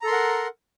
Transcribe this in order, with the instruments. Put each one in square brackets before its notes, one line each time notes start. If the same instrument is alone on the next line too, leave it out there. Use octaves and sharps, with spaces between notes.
[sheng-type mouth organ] A#5
A4
C6
A#4
F#5